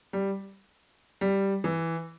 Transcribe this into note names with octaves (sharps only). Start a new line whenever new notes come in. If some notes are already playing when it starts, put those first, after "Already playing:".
G3
G3
E3